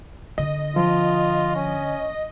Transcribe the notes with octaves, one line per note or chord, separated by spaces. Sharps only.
D3 D#5
F3 F4
C#4